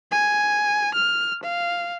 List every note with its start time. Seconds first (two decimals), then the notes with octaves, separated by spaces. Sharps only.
0.11 G#5
0.94 F6
1.43 F5